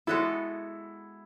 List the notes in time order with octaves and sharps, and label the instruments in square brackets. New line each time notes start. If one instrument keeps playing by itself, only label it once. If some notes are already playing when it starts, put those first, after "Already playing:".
[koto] G#3 B3 F#4 A4 [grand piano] E4